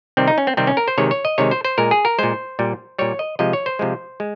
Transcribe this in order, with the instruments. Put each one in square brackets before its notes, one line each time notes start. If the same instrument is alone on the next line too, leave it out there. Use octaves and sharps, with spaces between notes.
[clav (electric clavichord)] C3 D#3 G3 C4
D#4
C#4
C4
C3 D#3 G3 C4
C#4
A#4
C5
C3 D#3 G#3 C#5
C#5
D#5
C3 D#3 G#3 C#5
C5
C5
A#2 G#3 A#4
G#4
A#4
A#2 G#3 C5
A#2 G3
A#2 G3 C#5
D#5
C3 F3 G#3 D#5
C#5
C5
C3 F3 G#3
G#3